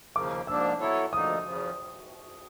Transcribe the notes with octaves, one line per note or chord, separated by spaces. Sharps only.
D#2 C#3 F3 A#3 D6
G#2 F3 A#3 D4 E6
F#3 B3 E4 A4 C#5
D2 D3 F3 A#3 D#4 D#6
E2 C#3 F3